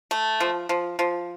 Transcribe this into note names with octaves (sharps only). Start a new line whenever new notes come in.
A3
F3
F3
F3